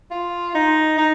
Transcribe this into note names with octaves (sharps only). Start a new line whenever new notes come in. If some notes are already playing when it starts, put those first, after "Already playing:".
F4
D#4
D#4